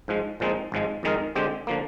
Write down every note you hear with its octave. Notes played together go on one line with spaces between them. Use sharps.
G#2 F3 G#3
A#2 F3 G#3 C4 D#4
G#1 G#2 F3 G#3
F2 D#3 G#3 D#4 A#4
D3 G#3 C4 G4
D3 F3 A#3